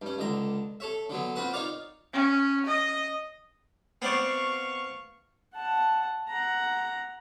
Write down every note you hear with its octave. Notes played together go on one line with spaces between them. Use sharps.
G2 C#4
C#2 D3 A#5
A4 C#5 E5
D3 F#3 B3
C4 F4 F#4 B4 D#6
D#4 F4 A#4 C#5 D5 F5
C#4
D#5
B3 C4 D5 F5 C#6
F#5 A5
F#5 A#5